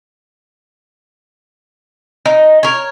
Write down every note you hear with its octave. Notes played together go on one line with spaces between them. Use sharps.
D#4
A#4 C#5